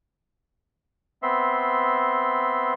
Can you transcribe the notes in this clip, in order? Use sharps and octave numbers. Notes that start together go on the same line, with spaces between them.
B3 C4 E5 C6